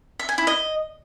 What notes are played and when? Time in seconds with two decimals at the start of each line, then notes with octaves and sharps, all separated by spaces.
0.19 E5
0.29 G#5
0.38 E4
0.47 D#5